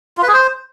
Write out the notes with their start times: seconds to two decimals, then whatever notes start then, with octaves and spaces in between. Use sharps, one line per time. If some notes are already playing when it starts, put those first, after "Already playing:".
0.18 F4
0.23 B4
0.28 G#4
0.33 C5